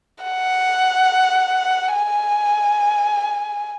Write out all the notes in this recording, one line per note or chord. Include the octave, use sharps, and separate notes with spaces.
F#5
G#5